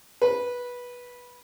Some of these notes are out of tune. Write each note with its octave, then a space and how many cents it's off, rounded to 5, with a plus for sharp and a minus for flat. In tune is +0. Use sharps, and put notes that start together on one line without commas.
B4 -15